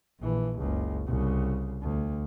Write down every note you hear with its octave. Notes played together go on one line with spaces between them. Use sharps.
A#1 E3
F#1 C#2
C2 C#3
D2